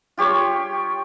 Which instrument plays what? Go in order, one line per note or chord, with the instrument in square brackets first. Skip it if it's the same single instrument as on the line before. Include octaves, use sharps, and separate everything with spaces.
[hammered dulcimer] F4 G4 C#5